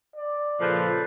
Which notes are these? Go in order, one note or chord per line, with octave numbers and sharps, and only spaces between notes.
D5
A#2 C#3 F3 A4 B4